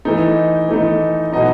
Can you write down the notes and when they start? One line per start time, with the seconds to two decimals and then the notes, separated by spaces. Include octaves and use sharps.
0.05 E3 A3 D#4 D#5
0.69 E3 A3 D#4
1.32 B2 F#3 B3 D#4 D#5